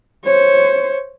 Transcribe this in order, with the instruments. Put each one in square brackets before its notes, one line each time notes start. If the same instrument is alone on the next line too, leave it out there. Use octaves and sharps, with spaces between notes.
[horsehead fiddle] C5 C#5